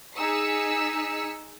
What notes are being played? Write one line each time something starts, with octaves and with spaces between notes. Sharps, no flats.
D#4 G#4 E6 B6 C#7